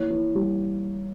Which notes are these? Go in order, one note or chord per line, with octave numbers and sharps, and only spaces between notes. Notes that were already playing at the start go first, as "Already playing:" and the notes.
Already playing: E3 A#3 C#5
E3
G3